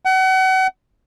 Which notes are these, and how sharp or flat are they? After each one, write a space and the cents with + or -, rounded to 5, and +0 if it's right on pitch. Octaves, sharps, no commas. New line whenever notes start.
F#5 +35